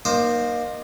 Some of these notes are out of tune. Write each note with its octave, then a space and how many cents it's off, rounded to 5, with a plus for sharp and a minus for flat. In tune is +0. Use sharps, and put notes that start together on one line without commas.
A#3 +25 D#4 -15 C5 +5